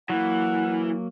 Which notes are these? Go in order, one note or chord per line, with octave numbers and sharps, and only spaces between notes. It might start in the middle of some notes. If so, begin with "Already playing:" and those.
E3 F#3 A#3 F#5